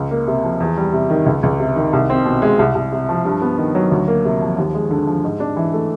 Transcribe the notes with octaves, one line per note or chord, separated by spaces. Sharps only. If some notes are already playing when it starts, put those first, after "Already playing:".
Already playing: C#2
A#3
C3
F3
E2
G3
C3
D#3
C#2
C#2
C3
D#3
C2
C4
B2
G#3
C2
C2
C3
F3
G2
B3
D#3
F#3
D2
A#3
C3
F3
D#2
G#3
D3
F3
G#2
D4
E3
A3